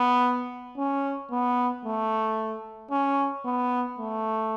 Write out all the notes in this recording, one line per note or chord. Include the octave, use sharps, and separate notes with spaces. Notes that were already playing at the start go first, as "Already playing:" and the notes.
Already playing: B3
C#4
B3
A3
C#4
B3
A3